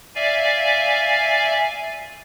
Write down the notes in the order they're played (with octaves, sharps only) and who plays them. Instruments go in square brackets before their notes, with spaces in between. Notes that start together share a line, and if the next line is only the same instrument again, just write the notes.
[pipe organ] D5 E5 F5 G#5